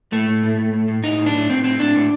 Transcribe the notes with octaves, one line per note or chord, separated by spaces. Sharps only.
A2 A3
A2
A2
A2
A2
A2
A2 D#4
A2
D4
A2
A2 C4
A2 C4
A2 D4
A2